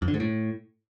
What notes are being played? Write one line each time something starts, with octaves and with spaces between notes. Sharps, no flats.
F2
D3
G#2
A2